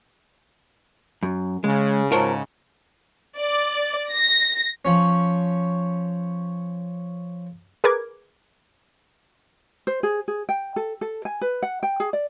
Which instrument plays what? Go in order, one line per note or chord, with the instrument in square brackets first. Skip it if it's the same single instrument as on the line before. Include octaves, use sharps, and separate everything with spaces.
[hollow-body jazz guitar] F#2
[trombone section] C#3 [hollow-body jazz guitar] G#3
[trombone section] G#2 C#3 [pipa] F3 F#3 [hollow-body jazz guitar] A#4
[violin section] D5
A#6
[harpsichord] F3 C#4
[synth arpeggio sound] G#4 A#4 B4 D6 G#6
[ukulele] C5
G#4
G#4
G5
A4
A4
G#5
B4
F#5
G5
G#4
D5